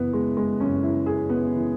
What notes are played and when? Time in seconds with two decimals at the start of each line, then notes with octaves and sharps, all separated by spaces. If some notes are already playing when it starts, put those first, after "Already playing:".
Already playing: F#1 F#2 E3 B3 E4
0.13 G#3
0.37 G#3
0.60 F#1 F#2 E3 C#4
0.83 E4
1.06 G#4
1.29 B3
1.56 E3